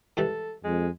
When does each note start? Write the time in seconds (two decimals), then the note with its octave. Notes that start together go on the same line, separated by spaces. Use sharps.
0.17 G#2 E3 G3 A4
0.64 F2 G#3